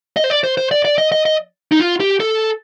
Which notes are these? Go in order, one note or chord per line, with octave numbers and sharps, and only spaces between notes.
D#5
C5
D5
C5
C5
D5
D5
D#5
D#5
D#5
D#4
F4
G4
A4